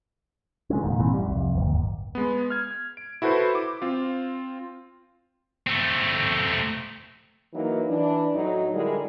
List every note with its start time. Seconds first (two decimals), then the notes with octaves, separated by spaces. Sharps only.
0.70 C#3 G#3 A3 C#4
0.83 F1 A#2 D#3
0.98 A#2 E3 G3 C4
1.14 F#2 G3
1.28 C2 F2
1.55 D1 G1 D#2
2.15 G#3 B3
2.50 F6 G#6
2.97 D7
3.22 E4 F#4 A4 B4 C5
3.55 D6
3.82 C4 F4
5.67 A3 C4
7.54 E3 F#3 A#3 D#4
7.89 E3 D4
8.35 A2 F#3 D#4
8.74 D3 G3 G#3 E4 G#4 A#4